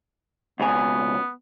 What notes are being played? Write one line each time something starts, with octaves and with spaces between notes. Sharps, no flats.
C#2 B2 B3 G#5